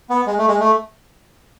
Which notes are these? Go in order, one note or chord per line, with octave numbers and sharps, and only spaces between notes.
B3
G#3
A3
G#3
A3